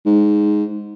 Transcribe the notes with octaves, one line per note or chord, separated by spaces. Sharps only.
G#2